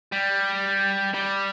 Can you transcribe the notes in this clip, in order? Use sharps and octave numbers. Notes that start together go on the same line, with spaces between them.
G3
G3